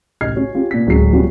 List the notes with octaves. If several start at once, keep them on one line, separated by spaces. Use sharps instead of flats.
A1 C#3 D#5 F6 G#6 C7
C#4 F#4 C#5
C#4 F4 G4
A#2 B6
D1 F#3 G#3 C#4 C7
F#3 G3 B3 C#4 F4 F#4